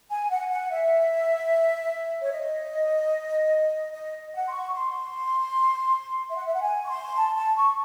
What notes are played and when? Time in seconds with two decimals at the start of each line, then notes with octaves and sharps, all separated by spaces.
0.10 G#5
0.30 F#5
0.50 F#5
0.71 E5
2.21 C#5
2.32 D#5
3.93 D#5
4.34 F#5
4.47 C6
4.53 C#6
4.74 C6
6.29 E5
6.35 F#5
6.46 E5
6.54 F#5
6.62 G#5
6.84 C#6
6.89 C6
7.16 A5
7.36 A5
7.56 C#6